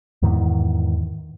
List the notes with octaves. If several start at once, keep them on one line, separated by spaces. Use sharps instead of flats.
E2 G#2 D#3 E3